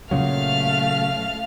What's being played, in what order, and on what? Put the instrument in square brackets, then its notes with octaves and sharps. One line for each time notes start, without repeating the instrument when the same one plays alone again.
[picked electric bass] A#2 C#3 F#3 [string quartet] A3 F5 F6